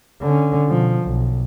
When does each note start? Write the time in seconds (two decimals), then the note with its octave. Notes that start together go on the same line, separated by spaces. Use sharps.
0.21 D3 C#4
0.69 B2 F3
1.02 B1